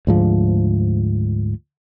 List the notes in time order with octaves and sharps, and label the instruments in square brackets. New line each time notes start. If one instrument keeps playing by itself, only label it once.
[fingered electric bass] D2 G#2 F3